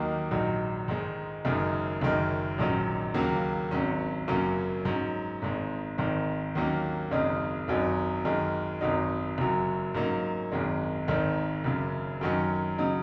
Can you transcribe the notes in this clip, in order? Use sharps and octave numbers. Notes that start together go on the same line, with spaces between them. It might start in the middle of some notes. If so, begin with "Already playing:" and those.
Already playing: D#2 D#3 F#3 A#3 D#4
A#1 G#2 D#3 F#3
G#2 D#3 G#3
F#1 F#2 D#3 G#3 D#4
F#1 F#2 D#3 G#3
A#1 G#2 D#3 F#3 C#4
D#2 C#3 F#3 A#3
G#1 G#2 F#3 C#4
F#1 F#2 F#3 A#3 C#4
G#2 F#3 C#4
G#1 G#2 G#3
G#1 G#2 D#3
D#2 D#3 F#3 A#3 C#4
G#1 F#2 C#3 G#3 D#4
G#1 F#2 F#3 D#4
F#2 D#3 G#3
G#1 F#2 F#3 D#4
F#1 F#2 F#3
G#2 F#3 A#3 C#4
G#1 F#2 D#3 G#3
G#1 G#2 D#3
F#1 F#2 C#3
F#2 D#3 F#3 C#4
C#3 F#3 D#4